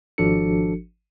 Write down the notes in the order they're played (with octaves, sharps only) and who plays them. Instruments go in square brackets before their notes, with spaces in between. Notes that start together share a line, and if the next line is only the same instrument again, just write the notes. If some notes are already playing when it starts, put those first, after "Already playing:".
[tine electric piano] G#1 F3 D4 F#4 A4 C#7